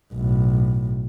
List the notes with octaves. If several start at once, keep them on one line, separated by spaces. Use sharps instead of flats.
B1 A2